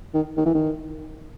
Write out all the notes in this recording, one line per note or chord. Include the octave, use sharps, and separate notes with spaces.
D#3
D#3
E3
D#3